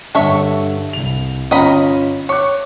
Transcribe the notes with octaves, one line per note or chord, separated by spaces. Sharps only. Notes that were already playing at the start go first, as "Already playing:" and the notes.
G2 D3 A4 C#5 E5
C2 F7
G1 C#4 F4 D#5 A#5 B5
C#5 D6 F#6